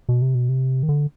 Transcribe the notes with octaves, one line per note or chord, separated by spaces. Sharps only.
B2
C3
B2
C3
D#3
D3